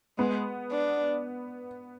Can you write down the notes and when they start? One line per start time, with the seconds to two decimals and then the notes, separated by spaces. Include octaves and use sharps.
0.18 G#3 B3
0.71 D4